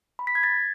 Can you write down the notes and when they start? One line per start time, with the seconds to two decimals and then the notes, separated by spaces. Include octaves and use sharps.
0.19 B5
0.27 B6
0.35 G#6
0.43 A6